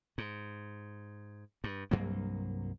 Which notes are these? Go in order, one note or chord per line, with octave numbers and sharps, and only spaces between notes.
G#2
G2
C2 G2 F#3 A#3